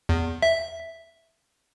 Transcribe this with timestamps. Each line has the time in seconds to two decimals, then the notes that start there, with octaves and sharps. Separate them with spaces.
0.09 E2
0.42 E5